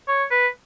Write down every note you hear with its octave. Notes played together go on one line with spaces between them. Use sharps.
C#5
B4